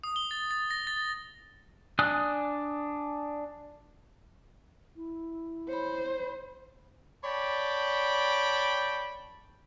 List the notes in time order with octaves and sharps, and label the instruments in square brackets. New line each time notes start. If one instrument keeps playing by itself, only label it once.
[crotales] D#6
G7
A6
A6
A#6
A6
[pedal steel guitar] D4 G#5 D#6 F#6
[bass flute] E4
[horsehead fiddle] C5 [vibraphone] C#5 B5
[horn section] C#5 D5 G5 A5 B5